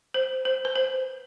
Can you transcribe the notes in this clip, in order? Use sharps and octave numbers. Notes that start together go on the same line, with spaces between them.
C5
C5
B4
C5